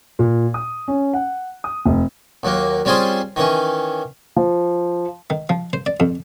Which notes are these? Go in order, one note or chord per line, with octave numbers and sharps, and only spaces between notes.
A#2
D#6
C#4
F#5
D#6
F1
D#2 F#3 A#3
G3 C4 C#4 F4 G#4 C5
D#3 E3 C#4
F3
D#3
F3
C5
D5
F2